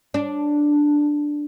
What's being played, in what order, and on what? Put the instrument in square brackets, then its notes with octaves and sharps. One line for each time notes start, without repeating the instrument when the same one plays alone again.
[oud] D4